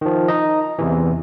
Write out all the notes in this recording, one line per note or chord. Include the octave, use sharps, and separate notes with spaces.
D#3 F3
D#4 D#5
E2 C3 E3